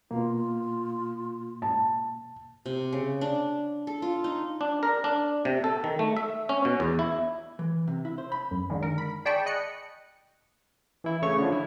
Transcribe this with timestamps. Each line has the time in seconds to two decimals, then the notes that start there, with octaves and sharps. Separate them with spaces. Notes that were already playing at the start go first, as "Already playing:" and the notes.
0.11 B2 A#3 F4
1.62 A5
2.66 C3
2.93 C#3
3.21 D4
3.87 A4
4.02 F4
4.24 D#4
4.61 D4
4.83 A#4
5.04 D4
5.45 C3
5.64 A4
5.84 D#3
5.99 A3
6.17 E5
6.49 C#4
6.65 B2
6.80 E2
6.99 E4
7.59 E3
7.88 C3
8.05 E4
8.18 C5
8.32 B5
8.51 F#2
8.70 D3 D#3 G#3
8.83 A#4
8.98 B5
9.25 G#4 D5 G5 A5 B5 C#6
9.46 D#5 F#6 C#7
11.04 E3 E4
11.22 C#3 A3 C#5 C#6
11.38 D3 F3
11.52 E4